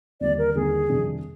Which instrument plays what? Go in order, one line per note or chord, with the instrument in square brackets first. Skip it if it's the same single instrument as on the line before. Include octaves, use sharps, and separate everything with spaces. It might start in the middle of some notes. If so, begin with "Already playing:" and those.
[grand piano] D#2 D3 G3 A#3 D#4 [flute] D5
[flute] A#4
[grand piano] D#2 D3 G3 A#3 D#4 [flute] G#4
[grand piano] F2 C3 D#3 G3 D4